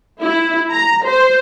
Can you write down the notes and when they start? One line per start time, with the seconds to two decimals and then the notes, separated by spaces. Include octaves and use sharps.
0.21 E4
0.71 A#5
1.05 C5